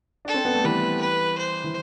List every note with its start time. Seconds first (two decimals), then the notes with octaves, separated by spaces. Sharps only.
0.25 D4 A4
0.34 C4
0.45 B3
0.55 A3
0.64 E3 G3 B4
1.01 B4
1.38 C5
1.64 E3